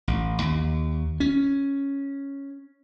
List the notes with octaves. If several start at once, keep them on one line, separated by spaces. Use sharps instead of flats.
A1
D#2
C#4